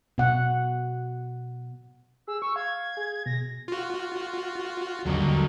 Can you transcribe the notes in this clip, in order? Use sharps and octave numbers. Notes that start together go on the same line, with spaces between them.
B2 F#5
G#4 E6
C#6 E6
F5 G#6
G#4
B2 A#6
F4 F#4
G#1 D#2 D3 F#3 G3 D#5